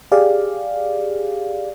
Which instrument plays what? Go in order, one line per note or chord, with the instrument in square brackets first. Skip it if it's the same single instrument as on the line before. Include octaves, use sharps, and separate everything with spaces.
[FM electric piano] G4 G#4 D5 F5